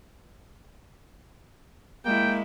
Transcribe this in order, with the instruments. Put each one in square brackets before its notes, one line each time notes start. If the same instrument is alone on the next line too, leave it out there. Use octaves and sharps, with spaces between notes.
[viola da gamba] G#3 E4 [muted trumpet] A#3 [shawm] G5